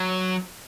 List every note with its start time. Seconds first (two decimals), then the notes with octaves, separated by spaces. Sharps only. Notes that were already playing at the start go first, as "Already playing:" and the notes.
Already playing: F#3